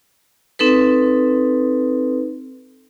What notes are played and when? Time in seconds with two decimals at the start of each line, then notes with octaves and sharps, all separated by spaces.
0.59 C4 D#4 A4 B4